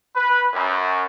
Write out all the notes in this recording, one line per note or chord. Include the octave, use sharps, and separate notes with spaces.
B4
F#2